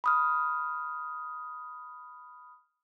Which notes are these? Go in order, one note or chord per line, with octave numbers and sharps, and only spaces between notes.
B5 D#6 F6